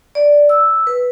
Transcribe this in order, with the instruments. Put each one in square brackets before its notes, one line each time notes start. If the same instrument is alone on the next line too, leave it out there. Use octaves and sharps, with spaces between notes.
[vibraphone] D5
E6
B4